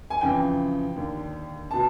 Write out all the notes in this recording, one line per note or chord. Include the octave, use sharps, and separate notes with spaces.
G#5
F2 C#3 E3 G5
D#2 D3
B2 A5